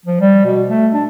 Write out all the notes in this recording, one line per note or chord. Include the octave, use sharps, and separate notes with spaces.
F3
G3
B2
A3
D4